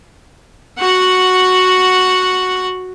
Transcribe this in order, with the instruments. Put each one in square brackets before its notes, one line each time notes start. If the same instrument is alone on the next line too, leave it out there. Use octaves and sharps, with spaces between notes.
[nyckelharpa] F#4 F#5